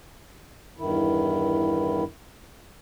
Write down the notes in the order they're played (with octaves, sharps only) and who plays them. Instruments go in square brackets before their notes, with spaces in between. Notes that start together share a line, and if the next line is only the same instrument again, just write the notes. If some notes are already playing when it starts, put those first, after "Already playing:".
[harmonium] E2 G2 D#3 E4